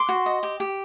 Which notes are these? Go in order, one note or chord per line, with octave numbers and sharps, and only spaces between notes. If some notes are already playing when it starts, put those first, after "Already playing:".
Already playing: C6 D6
F#4
D#5
G4
G4